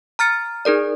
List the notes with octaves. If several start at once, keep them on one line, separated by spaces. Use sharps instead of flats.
A#5 F6 A6 C#7
D#4 G#4 A#4 D5